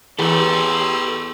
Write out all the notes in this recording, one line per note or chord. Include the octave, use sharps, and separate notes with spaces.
E2 G4 A4 B4 C#5 D#5 C6 E6